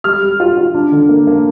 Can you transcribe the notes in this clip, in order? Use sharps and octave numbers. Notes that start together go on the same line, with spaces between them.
G3 F6
G3
F4
F4
D4
D3
A#3
A#3